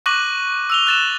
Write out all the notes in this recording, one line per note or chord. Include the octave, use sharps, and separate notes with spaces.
C#6 D6 F#6 A#6 D#7 F#7
E6 F7 G7
F#6 A6 E7